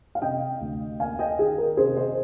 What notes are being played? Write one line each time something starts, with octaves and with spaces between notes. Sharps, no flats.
F5
C3 D#5 G5
D2
A#3 F5 G#5
D#5 G5
D#3 G#4
A#4
C3 G#4 C5
C5 D#5